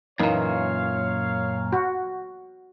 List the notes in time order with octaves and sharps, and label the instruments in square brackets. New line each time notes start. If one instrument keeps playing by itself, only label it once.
[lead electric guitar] F#2 A#2 [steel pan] E3 A#3 D#4 [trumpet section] C#5 F5
[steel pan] F#4